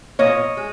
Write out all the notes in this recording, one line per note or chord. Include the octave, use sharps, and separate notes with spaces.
A#2 F3 A#3 C#5 D#5
G#3